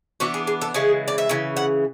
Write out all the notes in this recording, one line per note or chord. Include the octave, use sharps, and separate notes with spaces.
E3 B3 D4 F#4
G#4
G#4
A4
C#3 E3 G#3 G#4
D5
E5
C#3 E3
F#5